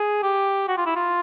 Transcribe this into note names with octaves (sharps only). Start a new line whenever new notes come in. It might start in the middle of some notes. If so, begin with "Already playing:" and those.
Already playing: G#4
G4
F#4
F4
E4
F4